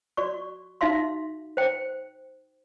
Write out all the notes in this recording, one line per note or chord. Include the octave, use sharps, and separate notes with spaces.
F#4 D5 C#6
D#4 F#4 E5 F5 C6
C5 G5